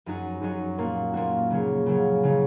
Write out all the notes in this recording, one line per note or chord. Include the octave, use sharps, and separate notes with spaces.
F#2 F#3 D#4 F#4
F#2 F#3 D#4 F#4
A#2 A#3 F#4
A#2 A#3 F#4
C#3 F#3 A#3
C#3 F#3 A#3
C#3 F#3 D#4